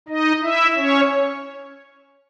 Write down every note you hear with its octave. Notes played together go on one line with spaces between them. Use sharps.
D#4 D#5
E4 E5
C#4 C#5